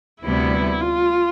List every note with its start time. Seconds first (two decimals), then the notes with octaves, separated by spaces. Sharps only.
0.22 D2 C3 G3 B3 E4
0.81 F4